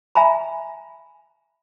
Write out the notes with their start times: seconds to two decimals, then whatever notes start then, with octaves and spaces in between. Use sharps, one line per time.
0.15 E5 G#5 A#5 B5